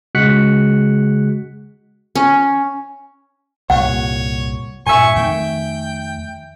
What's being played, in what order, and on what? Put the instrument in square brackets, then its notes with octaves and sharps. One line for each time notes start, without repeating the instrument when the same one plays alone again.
[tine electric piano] C#3 G#3 F#4 F#6 B6 C#7
[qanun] C#4
[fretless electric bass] C2 G2 A#2 [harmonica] C#5 [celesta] F#5
[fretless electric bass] G2 A#2 [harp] E5 G#5 [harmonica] C#6
[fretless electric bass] F2 D#3 A3 [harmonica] G5